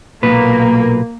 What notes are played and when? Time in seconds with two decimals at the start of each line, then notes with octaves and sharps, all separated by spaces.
0.23 B1 A#2 A#3 B4